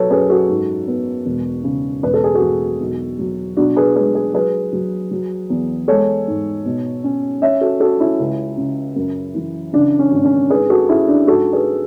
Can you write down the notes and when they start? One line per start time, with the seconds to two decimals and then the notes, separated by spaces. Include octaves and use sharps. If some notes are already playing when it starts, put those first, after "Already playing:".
Already playing: B1 F#3 A4 B4 C#5
0.10 F#2 G#4 B4
0.30 F#4 A4
0.49 G#2
0.87 B3
1.26 E1
1.64 C#3
2.03 E1 B4
2.14 A4
2.24 G#4
2.35 F#4 A4
2.42 E1
2.81 B1
3.19 F#3
3.57 B2 D4 F#4
3.76 G#4 B4
3.95 G#3 G#4 B4
4.14 G#4 B4
4.34 F#3 G#4 B4
4.73 F#3
5.11 F#3
5.50 E2
5.88 G#3 A4 C#5
6.27 G#2
6.65 B2
7.04 C#4
7.42 C#4 C#5 E5
7.61 F#4 A4
7.80 C#4 F#4 A4
8.00 C#4 E4
8.19 C#2
8.57 C#3
8.96 F#2
9.35 E3
9.73 C#3 D4
9.99 C#4
10.12 G#1
10.25 C#4
10.50 G#2 G#4 B4
10.70 F#4 A4
10.89 C#4 E4 G#4
11.08 D4
11.27 G#2 F#4 A4
11.53 G#4 B4